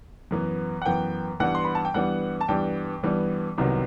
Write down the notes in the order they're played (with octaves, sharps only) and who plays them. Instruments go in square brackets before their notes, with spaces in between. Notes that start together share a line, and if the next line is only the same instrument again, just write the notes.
[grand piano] F#2 E3 B3
F#5
F#2 E3 B3 G5
G2 E3 G3 B3 F#5
C6
B5
A5
G5
G2 E3 G3 B3 F#5
A5
G2 E3 G3 B3 G5
G2 E3 G3 B3
C2 C3 D#3 F#3 B3